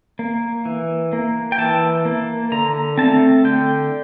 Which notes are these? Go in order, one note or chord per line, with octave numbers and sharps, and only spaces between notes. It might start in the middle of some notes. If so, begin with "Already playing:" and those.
A#3
E3
A#3
G5
E3 A5
A#3
D3 A#5
A3 C4 A5
D3 G5